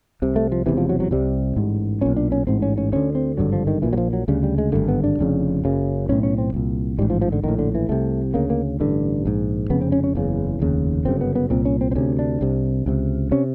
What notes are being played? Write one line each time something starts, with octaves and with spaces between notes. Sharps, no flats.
C2 C3
A3
F3
E1 E2 C3 E3
F3
F#3
F#3
C2 C3 G3
A1 G#2
B1 A#2 C#4
D4
C#4
A1 G#2 C4
C#4
C#4
D2 D3 C#4
C4
G#1 G2 D3 F#3
F3
D#3
A#1 A#2 E3
F#3
F3
F#3
D2 C#3 G3
G3
G#3
G#1 G2 D3 A3
B3
D4
F1 F2 C#3
F#1 F#2 C#3
B1 A2 C#4
C#4
C4
C2 A#2
A1 G#2 G3
F3
F3
D3
A#1 A2 D#3
D3
E3
C2 C3 A3
D2 C#3 A#3
A#3
A1 G2 D3
A#1 G#2
F1 F2 C#3 B3
C4
C#4
C#4
F#1 E2 C#3
F1 D#2 C#3
G1 F#2 C#3 C4
B3
B3
C2 A#2 C4
C#4
C4
C4
D2 C3 C#4
D4
C2 C3
C#2 C3
C3 C#4